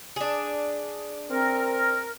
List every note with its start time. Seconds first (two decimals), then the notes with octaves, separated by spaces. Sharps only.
0.16 D4 G#4
1.31 C4 A#4